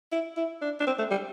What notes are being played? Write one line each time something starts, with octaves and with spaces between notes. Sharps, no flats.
E4
E4
D4
D4
C4
A3
G3